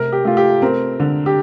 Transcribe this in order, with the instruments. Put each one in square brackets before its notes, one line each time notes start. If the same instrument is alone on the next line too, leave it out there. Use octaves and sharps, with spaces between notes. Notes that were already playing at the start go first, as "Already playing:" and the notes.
Already playing: [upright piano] C3 A3 [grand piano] A#4
[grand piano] G4
[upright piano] A3 [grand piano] F4
[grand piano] G4
[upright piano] C4 [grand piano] A#4
[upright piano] D3
[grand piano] G4